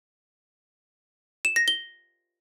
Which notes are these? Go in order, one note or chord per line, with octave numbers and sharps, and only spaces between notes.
E7
A#6
G7